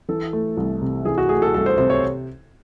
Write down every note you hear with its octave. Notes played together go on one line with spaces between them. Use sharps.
E3 A4
A3
C2
C3
E3 G#4
F#4
A3 G#4
A4
C2 A4
C5
C3 C5
C#5